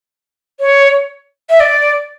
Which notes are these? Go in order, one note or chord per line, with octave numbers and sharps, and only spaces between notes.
C#5
E5
D5